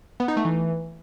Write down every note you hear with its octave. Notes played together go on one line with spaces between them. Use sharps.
B3
D#4
A3
E3